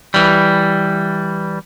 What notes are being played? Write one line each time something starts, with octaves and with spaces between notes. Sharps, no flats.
E3 G3